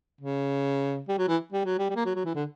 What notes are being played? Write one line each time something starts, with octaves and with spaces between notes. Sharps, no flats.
C#3
G3
F#3
E3
G3
F#3
G3
G3
A#3
F#3
F#3
E3
D3